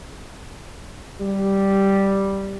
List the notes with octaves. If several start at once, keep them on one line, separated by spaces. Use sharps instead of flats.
G3